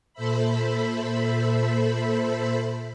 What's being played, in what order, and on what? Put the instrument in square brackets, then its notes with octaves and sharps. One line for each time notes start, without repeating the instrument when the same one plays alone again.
[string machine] A#2 A4 C5 E5 B5